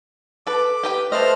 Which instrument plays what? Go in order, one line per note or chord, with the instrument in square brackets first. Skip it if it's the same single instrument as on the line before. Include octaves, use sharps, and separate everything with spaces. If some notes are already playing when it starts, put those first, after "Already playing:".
[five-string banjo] A4 B4 [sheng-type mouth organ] D6
[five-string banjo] G4 B4 G5
[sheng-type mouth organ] A3 C5 F6 [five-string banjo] A4 B4 D#5